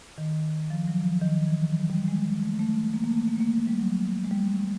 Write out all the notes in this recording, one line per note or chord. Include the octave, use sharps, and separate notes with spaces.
D#3
F3
F#3
F3
D#3
E3
F#3
G3
G#3
G#3
A3
A3
A#3
A#3
A3
A#3
A3
A#3
G3
F#3
G#3
G3